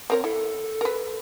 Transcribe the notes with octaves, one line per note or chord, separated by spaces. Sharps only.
C4 A#4 C#5
E4 A4
A#4 B4